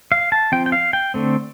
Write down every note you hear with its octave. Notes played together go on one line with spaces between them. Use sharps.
F5
A5
F3 C4 G5
G5
F5
G5
D3 A3 C4